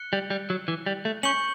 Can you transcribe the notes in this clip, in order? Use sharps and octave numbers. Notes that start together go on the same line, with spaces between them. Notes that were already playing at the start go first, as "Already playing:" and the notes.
Already playing: F#6 C#7 G7
G3
G3
F#3
E3
G3
A3
C#4 C#6 G6 C#7 F#7